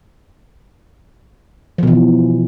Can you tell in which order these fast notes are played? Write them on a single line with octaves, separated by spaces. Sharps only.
F3 B2 E3